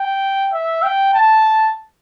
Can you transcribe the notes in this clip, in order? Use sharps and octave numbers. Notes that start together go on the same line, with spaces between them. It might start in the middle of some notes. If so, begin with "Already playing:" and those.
Already playing: G5
E5
G5
A5